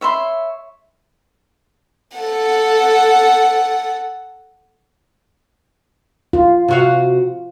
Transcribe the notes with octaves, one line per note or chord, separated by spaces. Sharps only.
C#5 E5 B5 C6
A4 F#5
F4
C3 F#4 F5